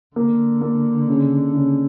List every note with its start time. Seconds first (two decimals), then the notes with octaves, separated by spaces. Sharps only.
0.16 D3 A#3
0.61 A#3
1.08 C#3
1.54 C#3